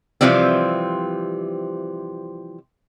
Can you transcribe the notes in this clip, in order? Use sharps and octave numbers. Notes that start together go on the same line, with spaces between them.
C3 E3 F3 G3 C4